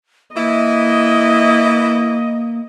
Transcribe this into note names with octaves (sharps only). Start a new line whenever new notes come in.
E3 A#3 E4 D#5